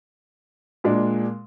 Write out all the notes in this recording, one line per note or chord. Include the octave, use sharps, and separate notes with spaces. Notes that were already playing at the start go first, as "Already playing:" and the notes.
A#2 G#3 D4